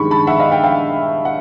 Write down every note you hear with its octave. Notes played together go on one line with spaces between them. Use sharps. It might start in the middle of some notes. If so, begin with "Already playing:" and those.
Already playing: G2 D#3 G#3 B5 C#6
A5 B5
E5 F#5
D#5 F5
F5 G5
F5 G5
F#5